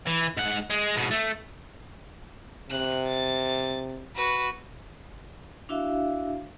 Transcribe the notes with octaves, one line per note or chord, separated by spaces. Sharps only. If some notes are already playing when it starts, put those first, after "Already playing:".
E3
G#2 F#5
G#3
G#2 B2
A3
C3 F#6
A6
F#4 B4
D4 E4 F#4 E5 F5